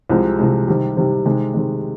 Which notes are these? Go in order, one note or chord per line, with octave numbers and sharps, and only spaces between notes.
C2 C3 F3 G#3
C2 C3 F3 G#3
C3 D#3 G3
C3 D#3 G3
C3 D#3 G#3
C3 D#3 G#3